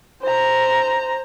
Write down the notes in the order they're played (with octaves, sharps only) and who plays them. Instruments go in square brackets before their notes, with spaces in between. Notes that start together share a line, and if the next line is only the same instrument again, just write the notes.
[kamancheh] C5 A#5